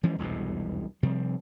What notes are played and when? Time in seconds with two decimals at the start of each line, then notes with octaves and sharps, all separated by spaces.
0.03 E3 F3 G#3 C#4
0.19 E1 C2 F2 B2
1.03 C3 F3 G3 C4